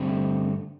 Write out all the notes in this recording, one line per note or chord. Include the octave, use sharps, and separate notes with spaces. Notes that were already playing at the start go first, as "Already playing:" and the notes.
Already playing: G2 D3 A3 C4 G4